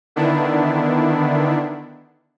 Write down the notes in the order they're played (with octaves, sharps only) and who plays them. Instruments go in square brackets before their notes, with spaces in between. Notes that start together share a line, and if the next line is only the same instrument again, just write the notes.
[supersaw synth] D3 D#3 B3 D4 E4